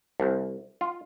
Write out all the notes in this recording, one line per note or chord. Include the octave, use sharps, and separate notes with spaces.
C2
F4